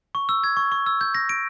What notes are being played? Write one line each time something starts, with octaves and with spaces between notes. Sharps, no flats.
C#6
E6
G#6
C#6
C#6
E6
G6
A#6
D7